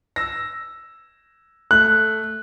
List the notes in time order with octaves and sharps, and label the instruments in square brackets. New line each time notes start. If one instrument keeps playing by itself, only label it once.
[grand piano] E6 A#6
[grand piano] A3 [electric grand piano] F#6